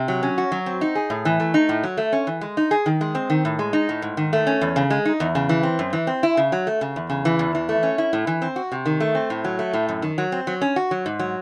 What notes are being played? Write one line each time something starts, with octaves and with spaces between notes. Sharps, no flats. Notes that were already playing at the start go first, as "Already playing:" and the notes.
Already playing: C3
F#3
C#4
F#4
F#3
C4
D#4
G#4
A2
E3
A3
D#4
A2
F#3
A3
C#4
E3
G#3
D#4
G#4
D#3
G#3
C4
D#3
A2
G#3
D#4
A2
G#2
D#3
A3
C#4
E2
C#3
G#3
D#4
E2
C#3
E3
C4
F#2
E3
C4
E4
C#3
F#3
A3
C#3
E2
C#3
E3
E2
E3
A3
C#4
E4
A2
E3
C4
F#4
C3
D#3
A3
C4
A2
F#3
A3
A2
F#2
D#3
F#3
C4
F#3
C#4
F#4
F#3
G#2
F#3